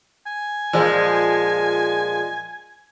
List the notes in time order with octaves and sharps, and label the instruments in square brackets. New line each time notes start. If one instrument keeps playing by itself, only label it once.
[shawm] G#5
[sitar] A#2 F3 G#3